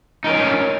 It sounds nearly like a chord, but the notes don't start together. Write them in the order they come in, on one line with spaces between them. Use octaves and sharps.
D#4 A#4 C#4